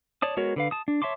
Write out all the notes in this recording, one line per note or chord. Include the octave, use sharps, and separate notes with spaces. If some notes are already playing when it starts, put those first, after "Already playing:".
C#5 D5 A5 D#6
G#3 B3 F#4 A#4 C#5
D3 B4 F5
A5 D#6
D4
C#5 E5 A5 C6 D6